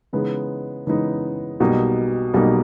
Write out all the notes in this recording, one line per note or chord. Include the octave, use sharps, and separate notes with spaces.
C#3 E3 G#3 B3 D#4
C#3 E3 G#3 B3 D#4
B1 B2 G3 A#3 D#4
B1 B2 G3 A#3 D#4